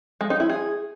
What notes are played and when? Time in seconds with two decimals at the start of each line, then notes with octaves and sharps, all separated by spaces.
0.21 G#3
0.30 D#4
0.40 E4
0.50 G#4